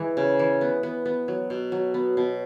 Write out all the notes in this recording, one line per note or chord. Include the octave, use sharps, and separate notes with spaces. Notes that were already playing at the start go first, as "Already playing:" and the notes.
Already playing: E3 G#3
C#3
E3
B3
B3
B3
F#3
B2
F#3
B3
B2